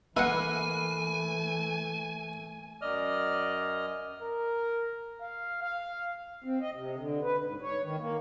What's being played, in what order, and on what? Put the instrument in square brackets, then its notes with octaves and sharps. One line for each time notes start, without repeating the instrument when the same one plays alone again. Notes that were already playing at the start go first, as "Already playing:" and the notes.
[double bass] E3 A3 [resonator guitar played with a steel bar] A#3 B4 [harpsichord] E4 F#5 [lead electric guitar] G#5
[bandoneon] F#2 D#5 F6 [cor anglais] D5
[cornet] A#4
F5
F5
[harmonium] C4
D#5
C3
D3
B4
G#2
C#5
D#3
A#3